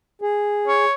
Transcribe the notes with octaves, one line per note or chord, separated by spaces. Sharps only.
G#4
C#5